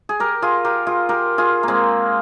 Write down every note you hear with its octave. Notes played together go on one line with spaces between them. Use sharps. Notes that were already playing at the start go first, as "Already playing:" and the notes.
G#4
G4 A#4
F4 G#4
G4 A#4
F4 G#4
G4 A#4
F4 G#4
G#3 A#3 C4